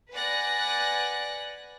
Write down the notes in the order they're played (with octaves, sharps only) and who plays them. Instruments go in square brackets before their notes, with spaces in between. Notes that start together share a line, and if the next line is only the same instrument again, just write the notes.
[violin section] B4 D5 F#5 G#5 F#6 A#6